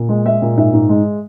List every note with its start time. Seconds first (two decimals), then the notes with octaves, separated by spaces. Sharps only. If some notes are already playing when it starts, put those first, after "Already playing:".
Already playing: A#2
0.09 G#3
0.25 G#3 E5
0.42 A#2
0.57 G#2 E5
0.73 G#2
0.89 G#3